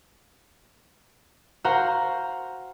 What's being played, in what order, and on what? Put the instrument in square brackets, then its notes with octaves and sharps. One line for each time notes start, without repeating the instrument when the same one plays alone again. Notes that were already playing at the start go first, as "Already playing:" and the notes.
[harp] F#4 C5 F5 F#5 A#5